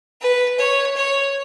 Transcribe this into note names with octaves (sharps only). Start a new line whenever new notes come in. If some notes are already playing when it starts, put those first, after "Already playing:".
B4
C#5
C#5